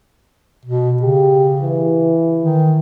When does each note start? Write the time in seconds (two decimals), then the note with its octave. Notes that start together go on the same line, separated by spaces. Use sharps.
0.65 B2
1.02 C#3 G4
1.62 E3
2.43 D#3